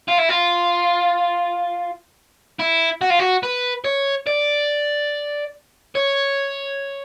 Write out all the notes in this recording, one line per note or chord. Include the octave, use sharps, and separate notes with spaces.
F4
E4
F4
E4
F#4
F4
F#4
B4
C#5
D5
C#5